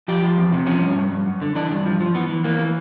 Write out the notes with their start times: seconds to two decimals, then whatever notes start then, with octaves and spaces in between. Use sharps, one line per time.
0.08 F3 G4
0.22 F3
0.37 E2
0.52 C3
0.67 F3 C#4
0.82 G2
0.96 G2
1.11 G2
1.26 F#2
1.41 D3
1.55 E3 D4
1.71 G2
1.85 F3
2.00 F3
2.15 E3 B3
2.29 E3
2.44 E3 A#3
2.59 E3